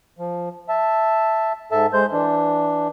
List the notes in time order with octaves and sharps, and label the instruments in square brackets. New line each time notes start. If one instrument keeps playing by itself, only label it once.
[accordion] F3
E5 A5
G#2 A4 E5 A5
G#3 C5 G6
E3 D4